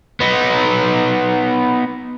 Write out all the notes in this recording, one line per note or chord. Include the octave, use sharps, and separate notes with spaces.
B3 D#4